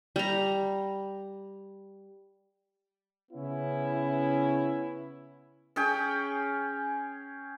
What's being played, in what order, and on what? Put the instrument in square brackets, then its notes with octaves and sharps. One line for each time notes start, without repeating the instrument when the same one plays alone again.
[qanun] G3 A#5
[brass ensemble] C#3 B3 C#4 E4
[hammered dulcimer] C#4 G#4 G5